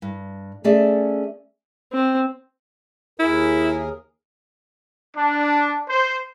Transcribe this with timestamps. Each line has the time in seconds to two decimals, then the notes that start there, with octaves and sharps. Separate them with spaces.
0.02 G2
0.64 A3 C#4 G#4 D5 E5
1.93 C4
3.19 D#2 E4 G#4 A#4
5.16 D4
5.89 C5